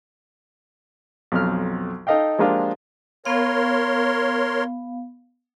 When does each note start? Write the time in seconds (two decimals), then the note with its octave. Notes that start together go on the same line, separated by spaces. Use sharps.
1.32 B1 F2 F6
2.07 D#4 A4 D#5 F5 G5
2.39 F3 G#3 A#3 D4 F4 G4
3.25 B3 A#4 C#5 F5 C6